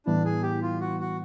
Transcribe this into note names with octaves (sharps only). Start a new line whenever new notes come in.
A2 E3 G3 B3 D4 E4
G#4
G4
F4
F#4
F#4